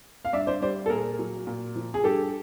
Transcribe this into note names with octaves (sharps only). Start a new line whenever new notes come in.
F5
G2 D5 E5
C5 D5
G3 C5 D5
A4
A#2 G#4 A#4
F#3
A#2
F3
G#4
G2 G4 A4